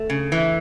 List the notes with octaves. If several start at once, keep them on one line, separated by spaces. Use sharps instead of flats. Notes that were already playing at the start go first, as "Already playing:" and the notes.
Already playing: A3
C#3
E3